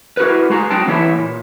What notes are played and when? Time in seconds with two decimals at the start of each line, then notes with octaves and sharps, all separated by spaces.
0.17 E4 F#4 A#4 B4
0.50 G#3 F#4 G#4 A#5
0.70 F#3 C4 D#4 F#4 G5 A5
0.88 E3 A#3 D4 E4 C#5 E5
1.18 A#2